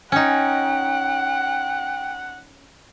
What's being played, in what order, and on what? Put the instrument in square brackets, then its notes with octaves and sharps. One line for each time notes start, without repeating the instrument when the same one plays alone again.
[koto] C#4 D#4 [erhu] F#5 [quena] G5